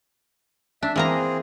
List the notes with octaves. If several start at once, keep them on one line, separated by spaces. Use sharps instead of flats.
D4 E5
E3 A#3 C4 G#4 A#5